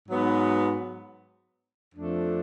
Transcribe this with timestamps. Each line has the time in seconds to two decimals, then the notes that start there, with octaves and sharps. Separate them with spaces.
0.09 G#2 F#3 B3
1.95 F2 F3 A3 D4